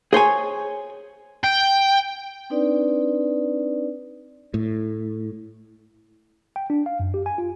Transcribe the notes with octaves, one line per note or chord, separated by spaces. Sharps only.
G#4 C5 C#5 G#5
G5
C4 D4 D#4 B4 D5
A2
G5
D4
F5
F#2
G4
G#5
F4